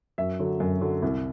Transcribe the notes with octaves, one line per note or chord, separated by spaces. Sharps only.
F#2 E5
D3 F#3
F#2
D3 F#3
C2